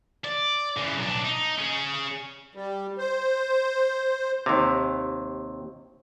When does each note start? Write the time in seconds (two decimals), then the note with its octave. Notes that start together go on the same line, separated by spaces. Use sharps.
0.24 D5
0.76 C#3 E3
0.97 B1 D4
1.24 D#4
1.58 C#4 G#4
2.55 G3
2.98 C5
4.46 D#2 C3